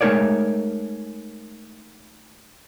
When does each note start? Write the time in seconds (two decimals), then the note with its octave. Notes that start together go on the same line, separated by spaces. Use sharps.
0.01 G#3 A3 D#4 A#4 C#5 D5